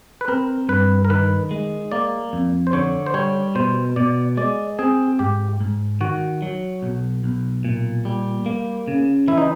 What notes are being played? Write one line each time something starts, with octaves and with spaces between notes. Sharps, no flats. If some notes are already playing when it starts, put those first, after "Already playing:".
B4
C4 A#4
G2 B4
A#4
D#3 B4
G#3
A#3 D5
F2
C5
D3 C#5
C5
G3 C#5
B2 C5
B2 D5
G#3 D5
C4 G#4
G#2 G4
G#2
D#3 F#4
F#3
B1
B1
A#2
G3
A#3
C#3
E3 E4
D#4